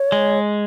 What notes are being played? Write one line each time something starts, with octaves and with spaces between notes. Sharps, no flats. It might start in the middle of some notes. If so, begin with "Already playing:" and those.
Already playing: C#5
G#3